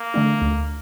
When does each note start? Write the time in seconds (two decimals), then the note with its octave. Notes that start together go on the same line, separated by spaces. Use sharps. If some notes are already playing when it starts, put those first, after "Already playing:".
Already playing: A#3
0.14 D3 A3 D4
0.42 D2